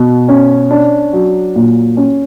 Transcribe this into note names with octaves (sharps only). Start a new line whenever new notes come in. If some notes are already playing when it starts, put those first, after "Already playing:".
Already playing: B2
C#4
D4
F#3
A#2
C#4